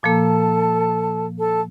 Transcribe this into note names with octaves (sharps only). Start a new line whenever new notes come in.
A#2 F3 A#3 A4 A5
A4 A5